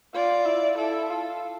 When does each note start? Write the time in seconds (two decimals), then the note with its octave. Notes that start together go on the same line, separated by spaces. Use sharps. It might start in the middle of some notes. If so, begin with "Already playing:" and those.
0.14 F4 D5
0.46 E4
0.78 E4 A4
1.10 F4 A4